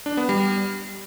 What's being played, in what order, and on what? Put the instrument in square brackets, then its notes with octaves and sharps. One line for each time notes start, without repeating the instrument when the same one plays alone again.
[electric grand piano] D4
B3
G3